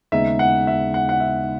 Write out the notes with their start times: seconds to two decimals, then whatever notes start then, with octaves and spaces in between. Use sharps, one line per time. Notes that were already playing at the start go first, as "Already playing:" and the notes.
0.12 D#2 C#3 G#3 B3 D#4 E5
0.39 F#5
0.67 E5
0.94 F#5
1.09 F#5
1.20 E5